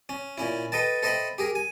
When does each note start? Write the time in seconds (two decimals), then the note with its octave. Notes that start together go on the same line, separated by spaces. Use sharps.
0.09 C#4
0.38 A#2 C#4 E4
0.72 A4 B4 D#5 G5 A5
1.03 A4 C5 D#5 E5 G5 B5
1.38 G4 G#4 A#4
1.55 G#5